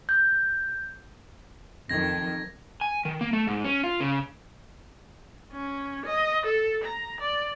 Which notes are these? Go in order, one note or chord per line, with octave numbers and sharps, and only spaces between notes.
G6
F2 D#3 G#6 A#6
G#5
D#3
A#3
A3
G#2
C#4
F4
C#3
C#4
D#5
A4
A#5
D5